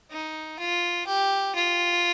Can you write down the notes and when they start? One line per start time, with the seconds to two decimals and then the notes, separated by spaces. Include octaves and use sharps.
0.11 D#4
0.59 F4
1.07 G4
1.55 F4